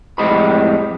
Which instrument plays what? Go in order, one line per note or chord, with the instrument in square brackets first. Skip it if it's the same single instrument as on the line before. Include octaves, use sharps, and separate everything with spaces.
[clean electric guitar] F2 A2 G#3 G4 D#5 B5